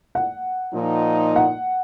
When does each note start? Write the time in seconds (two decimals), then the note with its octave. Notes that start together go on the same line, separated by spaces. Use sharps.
0.15 F#5
0.73 A#2 F3 D#4
1.36 F#5